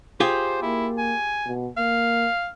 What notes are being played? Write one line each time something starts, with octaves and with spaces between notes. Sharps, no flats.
F4 G4 G#4 C5
A#3 E4
G#5
B2
A#3 F5